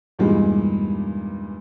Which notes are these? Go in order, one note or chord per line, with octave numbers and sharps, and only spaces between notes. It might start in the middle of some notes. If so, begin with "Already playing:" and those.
E2 G2 A#2 D#3 G3 G#3